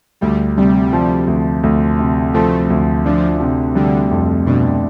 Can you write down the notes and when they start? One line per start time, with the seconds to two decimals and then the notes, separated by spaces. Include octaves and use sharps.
0.21 D2 G3
0.57 C3 G3
0.93 F3
1.28 D2
1.63 D2
1.99 C3
2.34 F3 A3
2.70 D2
3.05 F3 D4
3.40 C3
3.75 D3 G3
4.11 F2
4.46 B2 D4